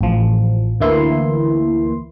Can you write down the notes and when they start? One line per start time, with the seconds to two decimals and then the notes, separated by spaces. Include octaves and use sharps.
0.01 A1 F3
0.80 D2 E3 A#3 E4 C6